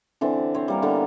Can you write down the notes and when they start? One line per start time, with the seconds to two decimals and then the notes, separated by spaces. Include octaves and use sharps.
0.21 D3 E3 C4 D4
0.54 C4 C#5
0.68 G3 A#3 A#4
0.82 D3 E3 A#3 B3